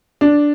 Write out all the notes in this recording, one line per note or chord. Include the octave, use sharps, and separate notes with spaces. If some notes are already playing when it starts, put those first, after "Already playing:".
D4